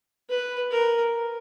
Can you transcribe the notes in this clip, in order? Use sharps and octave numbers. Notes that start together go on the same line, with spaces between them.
B4
A#4